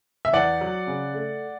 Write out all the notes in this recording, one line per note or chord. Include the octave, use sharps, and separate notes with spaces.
E5
E2 D5 F#5
F#3
C#3
A3